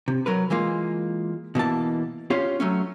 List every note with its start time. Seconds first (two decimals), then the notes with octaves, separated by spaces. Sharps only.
0.08 C3
0.26 F#3 A#4 B4
0.50 E3 G#3 A#3 F4
1.55 B2 E3 A#3 A5
2.30 C#4 F4 G4 C#5 F5
2.60 F#3 A3 C#4